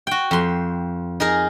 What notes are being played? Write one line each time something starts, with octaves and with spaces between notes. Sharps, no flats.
F#4 G5
F2 C6
D#4 G#4 A#4